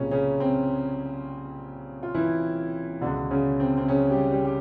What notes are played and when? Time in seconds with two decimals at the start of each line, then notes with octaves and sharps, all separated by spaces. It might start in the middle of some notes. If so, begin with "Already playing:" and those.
Already playing: C2 A#2 C#3 F3 C#4
0.11 C#3 C#4
0.40 C4
2.03 F4
2.14 E3 E4
3.01 B2 D3 D4
3.06 C#2
3.31 C#3 C#4
3.60 C4
3.78 C4
3.88 C#3 C#4
4.11 G3 G4
4.32 G3 G4
4.45 G4